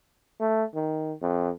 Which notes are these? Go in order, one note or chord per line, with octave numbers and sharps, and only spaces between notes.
A3
D#3
F2